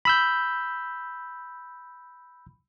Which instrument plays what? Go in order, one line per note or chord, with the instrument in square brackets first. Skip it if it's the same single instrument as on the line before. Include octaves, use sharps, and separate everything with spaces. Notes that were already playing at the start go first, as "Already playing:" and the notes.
[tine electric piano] B5 E6 G6